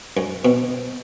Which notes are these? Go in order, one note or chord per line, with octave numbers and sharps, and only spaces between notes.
F#2
B2